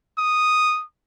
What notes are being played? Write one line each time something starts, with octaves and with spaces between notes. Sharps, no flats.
D#6